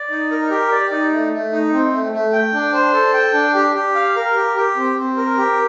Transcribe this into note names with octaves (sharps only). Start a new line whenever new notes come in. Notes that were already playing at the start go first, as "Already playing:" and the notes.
Already playing: D5
D#4
A#4
G4
D5
D#4
A3
A3
D#4
C4
A3
A3
G5
D4
C5
A4
G5
D4
G4
G4
F5
A#4
G4
G4
C4
C4
A#4
G4